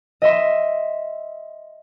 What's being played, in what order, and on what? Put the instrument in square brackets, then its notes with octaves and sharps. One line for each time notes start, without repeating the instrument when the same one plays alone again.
[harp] D#5 E5 C6